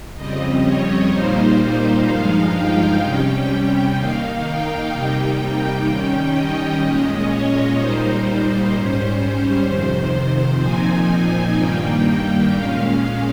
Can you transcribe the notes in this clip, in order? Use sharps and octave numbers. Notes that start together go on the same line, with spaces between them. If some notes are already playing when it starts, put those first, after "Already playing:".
F2 C#3 G3 C4 D#5
C#5
A#2 G3 A#3 D#4 C5
C5
G2 F3 G#3 D#4 F5
G5
C3 G3 C#4 G5
G5
D#3 A#3 D#4 F5
G5
C3 G3 A#3 D#4 G5
D#3 G3 C#4 G5
D#5
A#2 G#3 C#4
C#5
A#2 G3 A#3 D#4 C5
C5
G#2 G3 C#4 C5
F2 C3 D#3
A#2 F3 C4 D#4 G#5
G2 D#3 G3 A#3 G5
A#2 G#3 C#4 F5